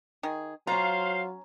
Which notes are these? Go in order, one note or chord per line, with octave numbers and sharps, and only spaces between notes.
D#3 G#4
F#3 C#4 F4 C5 F5 A#5